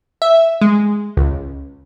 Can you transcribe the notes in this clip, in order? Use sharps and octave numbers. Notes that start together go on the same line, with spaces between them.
E5
G#3
C#2